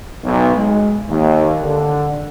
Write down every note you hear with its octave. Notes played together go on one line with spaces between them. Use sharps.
B1
G#3
D#2
D3